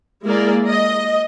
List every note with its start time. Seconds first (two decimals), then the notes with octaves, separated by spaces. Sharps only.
0.24 G#3 A#3 E4 G#4 A#4 D5
0.68 D#5